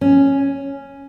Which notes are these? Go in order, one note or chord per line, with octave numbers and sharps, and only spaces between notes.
C#4